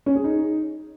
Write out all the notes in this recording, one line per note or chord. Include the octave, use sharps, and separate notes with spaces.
C#4
G#4
D#4